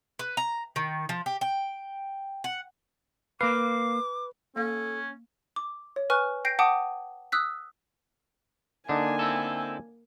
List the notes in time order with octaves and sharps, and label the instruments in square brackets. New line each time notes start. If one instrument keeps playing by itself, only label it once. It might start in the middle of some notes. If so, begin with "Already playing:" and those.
[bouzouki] B4
A#5
D#3
F3
G4
G5
F#5
[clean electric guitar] A#3 F5 [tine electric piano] B4 [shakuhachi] D6
[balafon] A#3 F5 [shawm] C#4 [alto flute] A4
[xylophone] D6
C#5
B4 G#5 C#6 F6 F#6
G5 G6 A#6 C7 D7
F#5 G5 A5 D6 D#6
D#6 E6 F#6 B6
[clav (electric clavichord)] D3 D#4 [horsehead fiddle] A#3 G#5 [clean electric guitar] D4
[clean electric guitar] C4 E4 A4